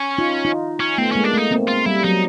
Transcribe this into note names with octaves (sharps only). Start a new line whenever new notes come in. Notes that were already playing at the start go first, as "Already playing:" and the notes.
Already playing: C#4
D#4 F4
D#4 F4
C#4
A3 B3 C4
G#3 A#3 C#4
D4
A3 D#4
A#3 C4
F4
G3 E4
F#3 D#4